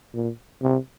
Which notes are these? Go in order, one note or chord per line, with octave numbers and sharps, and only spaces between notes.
A#2
C3